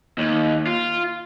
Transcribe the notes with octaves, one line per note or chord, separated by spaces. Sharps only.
D#2
F4